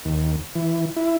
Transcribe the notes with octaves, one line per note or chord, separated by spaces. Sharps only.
D#2
E3
E4